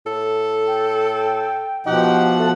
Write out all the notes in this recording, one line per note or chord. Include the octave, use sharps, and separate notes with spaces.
A2 A4
G5
B2 F3 D#4 G4 F#5
A3 A5